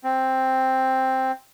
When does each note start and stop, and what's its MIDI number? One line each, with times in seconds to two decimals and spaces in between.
0.04 1.32 60